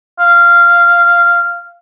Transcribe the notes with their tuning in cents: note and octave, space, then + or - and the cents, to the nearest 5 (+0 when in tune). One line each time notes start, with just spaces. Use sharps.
F5 -10